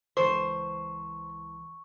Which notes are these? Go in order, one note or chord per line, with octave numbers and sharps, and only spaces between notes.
C#2 E3 C5 A5 C#6